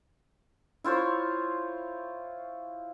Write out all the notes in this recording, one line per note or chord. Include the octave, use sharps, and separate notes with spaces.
E4 F4 C5 C#5